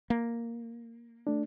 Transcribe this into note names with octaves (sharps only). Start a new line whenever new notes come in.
A#3
A3 D4